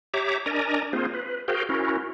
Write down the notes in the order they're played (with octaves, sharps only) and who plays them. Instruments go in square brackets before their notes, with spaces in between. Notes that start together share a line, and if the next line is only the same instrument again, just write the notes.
[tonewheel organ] G4 C#5 E5 A#5 D6
D4 A#4 D5 D#5 G#5 A#5
A#3 C4 F4 G#4 C5
B4
F#4 G#4 A#4 C5 F5 G5
C#4 E4 F#4 A#4